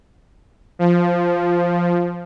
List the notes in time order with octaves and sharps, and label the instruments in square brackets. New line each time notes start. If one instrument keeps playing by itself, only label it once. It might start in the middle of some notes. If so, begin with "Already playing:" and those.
[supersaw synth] F3